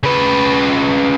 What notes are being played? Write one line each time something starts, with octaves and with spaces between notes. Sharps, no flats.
C#3 B4